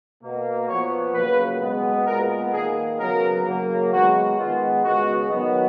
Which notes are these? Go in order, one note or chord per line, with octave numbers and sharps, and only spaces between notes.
B2 A#3
A#2 F3 B3 C#5
C#3 F#3 A#3 B4
B2 G#3 B3
A#2 G#3 B3 A#4
D#3 A#3 G#4
C#3 F#3 B3 A#4
C#3 F#3 A#3
D#3 G#3 B3 F#4
D#3 G#3 B3 F4
C#3 G#3 B3 F#4
D#3 F#3 B3